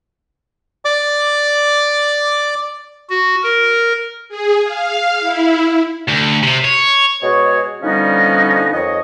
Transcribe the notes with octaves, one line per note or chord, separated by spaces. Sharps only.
D5 D6
F#4
A#4
G#4
F5
E4
D2
C3
C#5
B2 G#3 F#4 G#4 C#5
D3 F3 G3 B3 C#4 D#4
F2 D#3 C#5 D#5